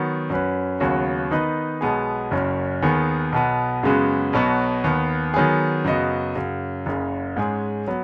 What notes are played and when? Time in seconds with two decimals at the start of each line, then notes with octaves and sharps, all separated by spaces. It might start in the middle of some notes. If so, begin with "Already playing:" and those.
Already playing: D#3 F#3 B3 F#4
0.30 F#2 F#3 C#4 B4
0.80 D#2 C#3 F#3 B3 F#4
1.31 D#3 B3 D#4 B4 D#5
1.81 B1 B2 G#3 B3 G#4
2.31 F#1 F#2 F#3 C#4
2.82 D#2 D#3 B3 G#4
3.32 B1 B2 B3
3.83 F#2 C#3 G#3 B3 F#4
4.33 B1 B2 F#3 B3 F#4
4.84 D#2 D#3 B3
5.34 D#3 F#3 B3 G#4
5.84 F#2 C#3 B3 F#4 D#5
6.35 F#2 C#3 F#3
6.86 F#1 F#2 C#3
7.37 G#2 G#3 C#4 G#4
7.88 F#3 B3